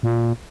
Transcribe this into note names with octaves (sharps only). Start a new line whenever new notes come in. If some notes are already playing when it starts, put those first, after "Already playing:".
A#2